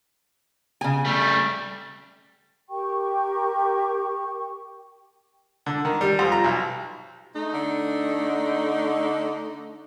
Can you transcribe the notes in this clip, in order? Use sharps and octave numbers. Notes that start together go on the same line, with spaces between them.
C#3 G#5
G3 A3
G4 A#4 G5 C#6
D3
D#3
G3
F2
A#5
B1
A3 D#4
D3